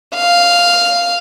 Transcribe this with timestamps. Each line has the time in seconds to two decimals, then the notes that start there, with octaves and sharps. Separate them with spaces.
0.15 F5